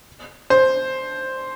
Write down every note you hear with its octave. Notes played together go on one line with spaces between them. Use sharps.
C5